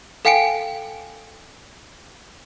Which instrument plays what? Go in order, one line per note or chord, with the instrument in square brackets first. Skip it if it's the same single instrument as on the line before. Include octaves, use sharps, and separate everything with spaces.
[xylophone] A4 F5 G5 G#5 C#7 D7